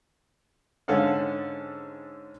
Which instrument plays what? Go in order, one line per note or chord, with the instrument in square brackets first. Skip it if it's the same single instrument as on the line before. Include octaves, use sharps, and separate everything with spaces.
[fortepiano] G#2 D3 C#4 A4 F5 F#5